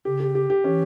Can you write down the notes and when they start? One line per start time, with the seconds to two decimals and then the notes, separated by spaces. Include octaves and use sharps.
0.05 C#3 G4
0.20 G4
0.35 G4
0.50 G4
0.64 E3 C#4